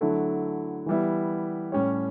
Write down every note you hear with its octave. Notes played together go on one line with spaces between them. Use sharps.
D3 F#3 A3 E4
E3 G3 B3 E4
A2 G3 C#4 G4 C#5